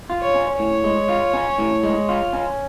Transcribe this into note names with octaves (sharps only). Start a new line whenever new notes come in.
F4
C#5
C#4
A2 C#5
G#3
F4
C#4
A2
G#3
F4
C#4